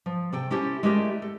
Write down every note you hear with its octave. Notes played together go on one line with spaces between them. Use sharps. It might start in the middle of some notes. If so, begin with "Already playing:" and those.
F3
C3 A4 G5
C#4 E4 G4 A4 C5 C#5
G#3 A3 E4 G4 A#4 D5
A4